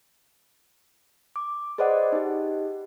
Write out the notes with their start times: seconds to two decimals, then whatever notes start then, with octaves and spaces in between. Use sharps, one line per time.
1.36 D6
1.78 G#4 B4 C5 D5 D#5 F#5
2.12 D#4 G4